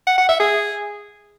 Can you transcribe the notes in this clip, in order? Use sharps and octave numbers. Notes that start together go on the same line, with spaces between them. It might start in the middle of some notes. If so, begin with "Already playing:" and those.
F#5
F#5
E5
G#4